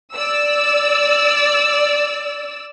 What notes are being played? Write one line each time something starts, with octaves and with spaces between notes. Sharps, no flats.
D5 E6